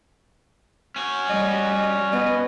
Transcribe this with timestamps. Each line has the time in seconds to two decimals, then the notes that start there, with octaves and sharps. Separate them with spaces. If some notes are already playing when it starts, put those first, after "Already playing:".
0.96 C#4 F#4
1.29 G3 D#5
1.71 D#5
2.12 B3 D#5